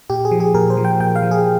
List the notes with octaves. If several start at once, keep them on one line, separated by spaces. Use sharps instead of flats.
A#2 G4
G#4
F3
G#4
A#2 A#4
C5
F3
G5
A#2 G5
F5
F3
G#4